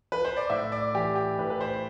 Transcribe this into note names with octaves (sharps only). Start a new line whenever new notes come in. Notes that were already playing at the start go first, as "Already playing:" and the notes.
B4
C5
D5
A2 E5
D5
E3 G4
G4
A2 B4
B4
C5